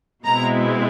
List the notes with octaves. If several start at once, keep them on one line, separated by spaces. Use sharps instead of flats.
B2 G#3 C4 E4 A#5